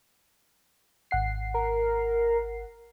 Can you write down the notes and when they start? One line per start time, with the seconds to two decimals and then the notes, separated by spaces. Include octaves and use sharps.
1.11 G#1 F#5 C7
1.54 A#4